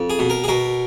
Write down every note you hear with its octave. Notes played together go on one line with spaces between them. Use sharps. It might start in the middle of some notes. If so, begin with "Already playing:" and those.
Already playing: F2
G#4
B2
A#4
G#4
B2 A#4